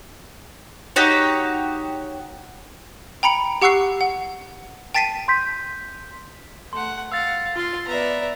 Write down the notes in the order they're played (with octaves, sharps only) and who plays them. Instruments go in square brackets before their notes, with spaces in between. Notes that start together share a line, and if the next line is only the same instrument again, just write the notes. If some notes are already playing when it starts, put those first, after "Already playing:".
[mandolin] D#4 F#4 G4 C#5
[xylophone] G5 A#5 B5 C#7 D7
G4 F#5 C#6 E6 F#6 C7
F#5
G5 A5 A6 B6 C7 D#7
[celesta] C6 G6 B6
[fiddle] A3 F#5 [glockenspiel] C6
[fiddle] F5 F#5 [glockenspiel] E6 A6
[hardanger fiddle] F4 [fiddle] C6
[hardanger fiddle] B3 D5 [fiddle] E5 A#5